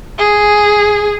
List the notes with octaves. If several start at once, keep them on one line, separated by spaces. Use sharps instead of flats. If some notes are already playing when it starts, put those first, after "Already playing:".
G#4